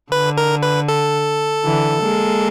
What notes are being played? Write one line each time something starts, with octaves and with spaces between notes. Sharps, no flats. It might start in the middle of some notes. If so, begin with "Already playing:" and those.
D3 B4
A#4
B4
A4
D3 E3
G#3 A#3